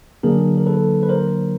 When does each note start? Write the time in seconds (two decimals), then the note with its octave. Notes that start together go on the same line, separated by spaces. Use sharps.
0.23 D3 F#3 A#3 D4 G#4 A#4
0.57 A#4
0.67 A4 B4
1.03 B4
1.09 A#4 C5